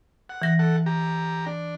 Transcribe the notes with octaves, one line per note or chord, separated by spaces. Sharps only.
F#5
E3 A#6
A4 F#5
G4 A#5
D4